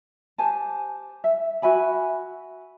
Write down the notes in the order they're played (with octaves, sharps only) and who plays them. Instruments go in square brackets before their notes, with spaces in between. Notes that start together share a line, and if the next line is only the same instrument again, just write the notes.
[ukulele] G4 C5 G#5 A5
E5
F#4 E5 G#5 B5